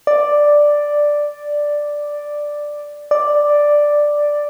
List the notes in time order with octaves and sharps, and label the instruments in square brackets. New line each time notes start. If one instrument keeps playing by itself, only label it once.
[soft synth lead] D5
D5